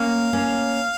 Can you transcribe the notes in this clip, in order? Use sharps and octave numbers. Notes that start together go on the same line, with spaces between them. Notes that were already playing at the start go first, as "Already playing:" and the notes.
Already playing: A#3 C#4 F5
A#3 C#4